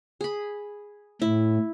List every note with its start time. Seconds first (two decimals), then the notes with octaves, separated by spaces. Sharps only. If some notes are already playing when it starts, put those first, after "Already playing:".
0.21 G#4 B5
1.22 A2 E4